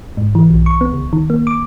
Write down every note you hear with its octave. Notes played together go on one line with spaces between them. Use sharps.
G#2
E3
B1
C#6
B3
C#2
D#3
A#3
D6